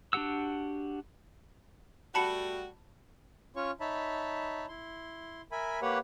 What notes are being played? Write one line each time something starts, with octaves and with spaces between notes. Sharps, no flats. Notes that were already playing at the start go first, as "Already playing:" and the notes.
D4 F#4 G4 F#5 E6
G3 A3 F#4 A5 B5 C#7
C#4 F4 C#5 C#6
D#4 C#5 E5 A5 B5
E4 C6
A#4 E5 G#5 B5
A#3 G4 B4 C#5 F#5